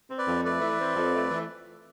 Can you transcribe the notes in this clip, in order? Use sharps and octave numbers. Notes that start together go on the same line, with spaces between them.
C4
B4 D5
F2
A3 B4 D5
E3
C4
F2
A3
E3